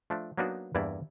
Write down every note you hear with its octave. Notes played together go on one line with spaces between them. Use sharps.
F3 A3 D4
F#3 A#3 B3 D4 D#4 F#4
E2 G2 E3 A#3 E4 D5